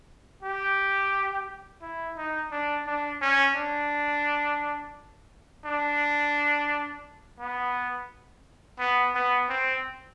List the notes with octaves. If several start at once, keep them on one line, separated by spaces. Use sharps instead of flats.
G4
E4
D#4
D4
D4
C#4
D4
D4
B3
B3
B3
C4